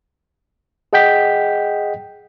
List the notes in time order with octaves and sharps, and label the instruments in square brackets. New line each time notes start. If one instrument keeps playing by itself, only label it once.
[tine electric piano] G#4 D#5 F#5 G5 G6 B6